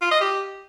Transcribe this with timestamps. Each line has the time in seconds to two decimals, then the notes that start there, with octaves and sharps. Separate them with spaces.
0.02 F4
0.11 D#5
0.21 G4